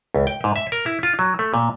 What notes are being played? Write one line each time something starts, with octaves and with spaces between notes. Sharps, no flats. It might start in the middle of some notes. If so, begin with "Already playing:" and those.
C#2
G5
G#2
E5
A#4
E4
F4
F#3
A3
A#2